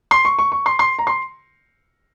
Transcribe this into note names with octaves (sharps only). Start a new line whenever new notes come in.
C6
C#6
C#6
C#6
C6
C6
A#5
C6